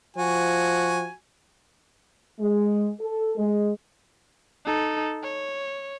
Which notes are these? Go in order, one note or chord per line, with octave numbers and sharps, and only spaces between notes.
F3 F#4 G#5
G#3
A4
G#3
D#4 A4
C#5